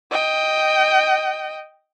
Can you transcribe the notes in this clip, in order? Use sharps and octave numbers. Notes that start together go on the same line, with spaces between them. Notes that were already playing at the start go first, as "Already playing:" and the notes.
D#5 G5